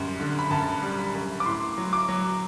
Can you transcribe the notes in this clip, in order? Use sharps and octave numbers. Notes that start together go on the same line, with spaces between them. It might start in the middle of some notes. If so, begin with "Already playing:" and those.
Already playing: F#2 G3 C6
D3
B5
F#2 A5
G3
B5
F#2
D6
A2 C6
F#3
D6
F#3